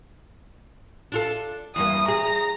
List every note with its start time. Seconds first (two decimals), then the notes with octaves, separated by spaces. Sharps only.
1.12 D4 F4 A4
1.76 E2 G2 A#3 D#6
2.08 G#4 A#5